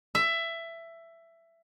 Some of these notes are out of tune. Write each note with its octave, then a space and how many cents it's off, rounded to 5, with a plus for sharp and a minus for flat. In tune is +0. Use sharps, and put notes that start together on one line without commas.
E5 +15